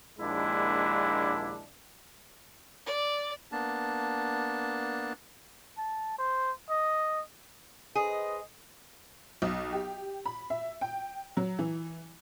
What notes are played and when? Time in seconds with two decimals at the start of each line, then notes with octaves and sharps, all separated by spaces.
0.19 A#1 D#2 G#3 D4 E4
2.86 D5
3.52 A#3 B3 D4 A5
5.78 A5
6.18 C5
6.70 D#5
7.95 G#4 B4 C5 D#5
9.42 B1
9.73 G4
10.26 B5
10.50 E5
10.81 G5
11.37 F#3
11.59 E3